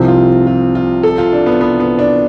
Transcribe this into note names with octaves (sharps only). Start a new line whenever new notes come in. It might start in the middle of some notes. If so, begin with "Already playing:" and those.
Already playing: C2 C3 F3 C4
F4
F4
F4
A4
F4
D4
B3
B3
B3
D4